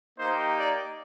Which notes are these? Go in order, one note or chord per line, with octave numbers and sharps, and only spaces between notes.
A#3 D#4 G4 C5
D5